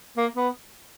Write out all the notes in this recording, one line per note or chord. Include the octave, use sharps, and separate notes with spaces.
A#3
B3